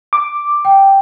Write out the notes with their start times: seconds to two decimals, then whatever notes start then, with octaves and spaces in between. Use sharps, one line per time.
0.13 D6
0.65 G5